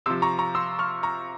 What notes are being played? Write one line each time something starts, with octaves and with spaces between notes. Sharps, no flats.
C3 F3 C6 E6
A#5 C#6
A#5 C#6
C6 E6
C#6 F6
A#5 C#6